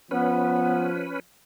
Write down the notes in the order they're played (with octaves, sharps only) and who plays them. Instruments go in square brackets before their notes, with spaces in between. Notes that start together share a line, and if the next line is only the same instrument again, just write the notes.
[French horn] F3 [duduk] B3 [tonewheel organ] C#4 B4